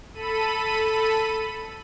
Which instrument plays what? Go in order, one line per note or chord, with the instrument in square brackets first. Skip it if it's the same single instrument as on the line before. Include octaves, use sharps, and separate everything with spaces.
[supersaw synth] A4 B5 D#7